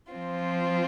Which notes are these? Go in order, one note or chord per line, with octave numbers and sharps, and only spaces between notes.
F3 C4 F4